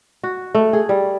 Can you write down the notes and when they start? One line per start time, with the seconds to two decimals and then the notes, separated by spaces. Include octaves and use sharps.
0.23 F#4
0.55 A3
0.73 G#4
0.89 G3